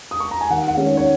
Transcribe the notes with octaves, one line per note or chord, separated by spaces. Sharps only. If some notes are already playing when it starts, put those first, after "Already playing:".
D#6
C#6
A#5
G#5
D#2 F#5
F#5
D#3 G#3 C#4
C#5
C#5